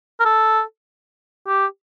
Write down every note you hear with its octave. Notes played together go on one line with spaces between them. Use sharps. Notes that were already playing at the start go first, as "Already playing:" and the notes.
A#4
A4
G4